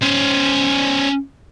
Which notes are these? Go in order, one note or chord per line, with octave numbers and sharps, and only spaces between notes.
C#4 C5